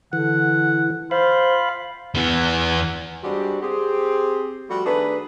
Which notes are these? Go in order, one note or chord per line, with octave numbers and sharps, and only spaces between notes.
D3 E3 F#5
F4 C5 F5 B5
E2 B3
G3 G#3 C4 D4 F#4 G4
C4 G4 G#4
F3 G3 A3 F#4
D#3 A3 D4 G#4 B4